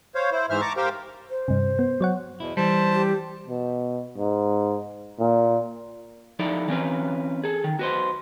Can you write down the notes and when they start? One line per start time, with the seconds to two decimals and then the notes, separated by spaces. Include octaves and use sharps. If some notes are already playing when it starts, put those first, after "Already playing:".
0.15 C5 C#5 F5
0.32 E4 C5
0.50 G#2 E3 C5 E5 F6
0.61 A5 A#5 C#6 D6
0.77 G4 A#4 C5 F5 G5
1.30 C5
1.48 G2 C3
1.79 B3
2.01 F#3 C#5 F#5
2.40 E2 B2 E4
2.57 E3 G3 C5 A5
2.93 G4
3.48 B2
4.18 G#2
5.20 A#2
6.39 F3 D#4 E4 A4 D5
6.68 E3 C4 C#4 B4
7.44 G#4 A4
7.64 D#3
7.79 F#4 B4 C5